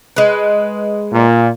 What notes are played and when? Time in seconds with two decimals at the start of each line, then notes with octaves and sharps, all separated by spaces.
0.16 G#3 B4
1.13 A#2